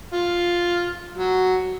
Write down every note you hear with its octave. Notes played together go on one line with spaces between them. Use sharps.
F4
F#3